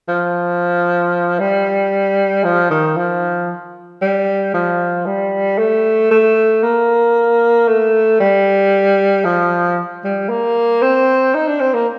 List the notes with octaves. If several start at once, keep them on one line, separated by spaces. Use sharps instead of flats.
F3
G3
F3
D#3
F3
G3
F3
G3
A3
A3
A#3
A3
G3
F3
G3
A#3
C4
D#4
D4
C4
A#3